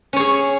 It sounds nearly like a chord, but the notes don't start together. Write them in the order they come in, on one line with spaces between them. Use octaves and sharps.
C#4 C#5 G#4